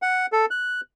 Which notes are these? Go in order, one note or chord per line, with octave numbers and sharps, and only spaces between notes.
F#5
A4
F#6